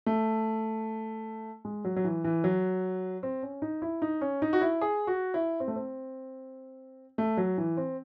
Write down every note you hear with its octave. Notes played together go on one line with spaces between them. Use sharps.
A3
G#3
F#3
F#3
E3
E3
F#3
C4
C#4
D#4
E4
D#4
C#4
D#4
F#4
E4
G#4
F#4
E4
C4
A3
C4
A3
F#3
E3
C4